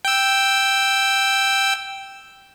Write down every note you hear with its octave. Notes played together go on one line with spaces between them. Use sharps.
G5 E6